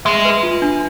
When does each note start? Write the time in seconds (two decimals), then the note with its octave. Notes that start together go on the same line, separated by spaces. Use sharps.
0.05 G#3 E5
0.25 B4
0.43 F4
0.62 D4